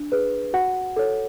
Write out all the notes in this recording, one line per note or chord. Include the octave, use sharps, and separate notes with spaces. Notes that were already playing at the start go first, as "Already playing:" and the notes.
Already playing: D4
G#4 B4
F#4 F#5
A4 C#5